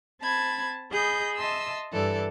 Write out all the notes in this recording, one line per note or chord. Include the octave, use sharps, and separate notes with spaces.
C4 A5 B5 G#6
G#4 D#5 B5 G6
D#5 E5 A5 C6 E6
G2 E3 A4 D5